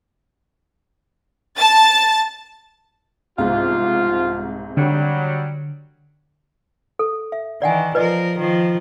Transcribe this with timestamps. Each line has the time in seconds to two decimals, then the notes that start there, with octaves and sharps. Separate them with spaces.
1.56 A5 A6
3.38 C2 G#2 B2 F3 F4 F5
4.77 D3 F#3 G3
6.99 A4
7.32 E5
7.62 D#3 E3 D5 F#5 G#5
7.95 F3 A#4 B4 D5 D#5
8.38 D#3 F3